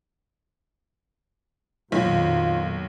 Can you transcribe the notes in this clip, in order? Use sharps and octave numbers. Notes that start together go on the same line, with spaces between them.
B1 F2 A#2 D#3 F4